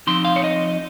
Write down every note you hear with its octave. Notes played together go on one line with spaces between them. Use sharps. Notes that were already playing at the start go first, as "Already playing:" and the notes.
F3 C4 D#4 C6
F5
C#5
D#5